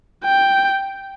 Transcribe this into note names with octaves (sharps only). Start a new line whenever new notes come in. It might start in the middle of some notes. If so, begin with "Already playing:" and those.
G5